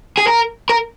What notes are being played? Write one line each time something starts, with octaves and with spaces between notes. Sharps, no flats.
G#4
A#4
A#4